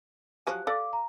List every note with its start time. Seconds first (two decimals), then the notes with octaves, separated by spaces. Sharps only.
0.47 F3 F#3 G4 G#5 F#6
0.67 A4 D5 F5 D6
0.93 A#5